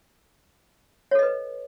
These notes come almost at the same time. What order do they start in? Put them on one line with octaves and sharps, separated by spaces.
C#5 A4 D#5 B4